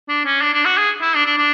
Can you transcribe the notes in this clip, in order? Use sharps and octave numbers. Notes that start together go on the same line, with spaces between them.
D4
C#4
D4
D4
F#4
G#4
E4
D4
D4
D4